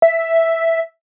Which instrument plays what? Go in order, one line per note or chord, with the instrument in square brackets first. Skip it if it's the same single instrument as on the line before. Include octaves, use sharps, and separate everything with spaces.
[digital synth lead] E5